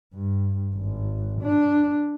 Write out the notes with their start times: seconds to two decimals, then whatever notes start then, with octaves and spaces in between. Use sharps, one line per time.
0.14 G2
0.75 G#1
1.42 D4